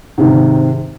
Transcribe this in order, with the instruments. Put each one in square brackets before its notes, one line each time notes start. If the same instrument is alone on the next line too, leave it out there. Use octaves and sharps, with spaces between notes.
[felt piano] G#2 C3 D#3